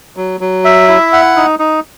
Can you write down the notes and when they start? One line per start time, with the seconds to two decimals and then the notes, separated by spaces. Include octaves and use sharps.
0.16 F#3
0.40 F#3
0.65 E5
0.88 E4
1.13 F#5
1.36 D#4
1.59 D#4